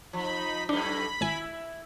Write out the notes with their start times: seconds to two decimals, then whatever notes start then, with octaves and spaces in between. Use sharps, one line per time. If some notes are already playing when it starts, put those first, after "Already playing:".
0.13 F3 D#4 B5
0.69 F#2 A2 D4 D#4 B5
1.21 G#1 E4 G#5